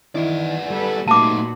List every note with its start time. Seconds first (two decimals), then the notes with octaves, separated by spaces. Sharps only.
0.15 D#3 E3 B3 E4 D5
0.70 G3 A4 B4
1.08 A#2 A3 B3 D#4 F#4 A5 D6